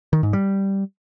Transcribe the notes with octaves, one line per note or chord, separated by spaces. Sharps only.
D#3
G#2
G3